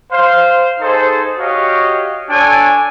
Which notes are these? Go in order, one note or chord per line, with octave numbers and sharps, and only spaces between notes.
C5 F5
D#4 G#4 A4 C5
F#4 G4 C#5 D#5 F5
D4 A4 C#5 G#5